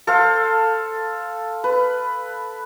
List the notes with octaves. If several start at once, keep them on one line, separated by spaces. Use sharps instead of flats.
A4 C5 F5
B4